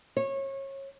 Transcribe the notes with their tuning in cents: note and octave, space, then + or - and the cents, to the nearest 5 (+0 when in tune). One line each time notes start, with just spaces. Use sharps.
C#5 -25